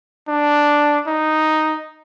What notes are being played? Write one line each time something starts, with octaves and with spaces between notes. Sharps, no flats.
D4
D#4